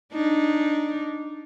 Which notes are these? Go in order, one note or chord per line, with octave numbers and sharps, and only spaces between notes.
D4 D#4